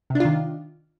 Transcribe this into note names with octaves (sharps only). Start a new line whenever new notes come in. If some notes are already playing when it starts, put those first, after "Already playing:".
C3 D#3 D4 F4